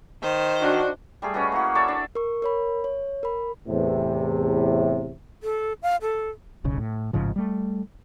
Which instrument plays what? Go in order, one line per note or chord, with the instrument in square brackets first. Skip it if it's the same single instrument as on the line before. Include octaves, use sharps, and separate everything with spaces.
[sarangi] D#3 [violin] C5
[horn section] D4 F#4
[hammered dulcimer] G3 A3 G#4
C#4 F#4 B4 D#5
A#3 E4 F#4
A4 C#5 D5 E5
D4
[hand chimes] A#4 C#6
A#4 C#5 B5
C#5
A#4 B5
[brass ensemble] E2 A2 C3
[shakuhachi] A4
F5
A4
[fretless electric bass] D1 B1 C#3
A2
A1 G#2 C#3 F3
G3 A3